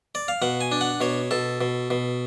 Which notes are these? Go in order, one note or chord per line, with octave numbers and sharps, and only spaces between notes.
D5
F5
B2 F#5
G#5
D4
F#5
B2 C#5
B2 A4
B2
B2